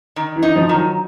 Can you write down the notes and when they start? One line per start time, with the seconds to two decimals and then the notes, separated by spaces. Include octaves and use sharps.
0.16 D#3
0.36 E3
0.43 D#4
0.56 F3
0.69 D#3
0.75 F#3